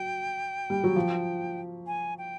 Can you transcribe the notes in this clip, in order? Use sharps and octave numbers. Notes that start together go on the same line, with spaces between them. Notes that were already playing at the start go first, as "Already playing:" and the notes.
Already playing: F#3 G5
G3
F#3
F3
G#5
G5